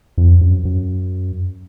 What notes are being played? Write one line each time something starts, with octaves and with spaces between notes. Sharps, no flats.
F2
F#2
F#2